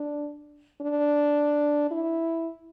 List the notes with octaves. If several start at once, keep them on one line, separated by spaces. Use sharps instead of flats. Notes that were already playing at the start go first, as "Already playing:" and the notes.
Already playing: D4
D4
E4